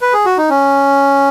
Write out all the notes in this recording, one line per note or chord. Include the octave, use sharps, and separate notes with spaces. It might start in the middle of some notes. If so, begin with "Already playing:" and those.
B4
G#4
F#4
D#4
C#4